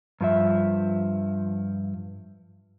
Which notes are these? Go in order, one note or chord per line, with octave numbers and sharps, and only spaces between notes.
G2 F3 E5